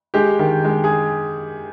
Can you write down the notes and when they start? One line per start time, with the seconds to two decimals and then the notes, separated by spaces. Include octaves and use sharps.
0.14 G#3 G4
0.39 D#3
0.64 G#3
0.84 G#4